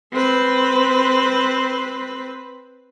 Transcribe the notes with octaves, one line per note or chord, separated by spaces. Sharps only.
C4 B4